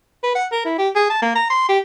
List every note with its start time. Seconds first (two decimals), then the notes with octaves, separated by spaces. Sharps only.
0.23 B4
0.35 F#5
0.52 A#4
0.65 E4
0.78 G4
0.95 G#4
1.10 A5
1.22 A#3
1.35 A#5
1.50 C6
1.69 G4